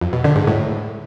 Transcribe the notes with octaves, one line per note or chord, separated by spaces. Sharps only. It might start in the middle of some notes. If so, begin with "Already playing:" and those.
F2
B2
D3
G#2
A2